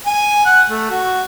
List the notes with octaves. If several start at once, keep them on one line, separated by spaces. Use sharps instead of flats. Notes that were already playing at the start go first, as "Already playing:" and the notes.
G#5
F#5
A3
F#4